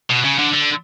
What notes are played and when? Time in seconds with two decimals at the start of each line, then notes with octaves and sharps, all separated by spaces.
0.10 B2
0.24 C#3
0.38 D3
0.53 D3